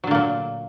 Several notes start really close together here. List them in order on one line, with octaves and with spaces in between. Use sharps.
F#3 D3 A#3 A#2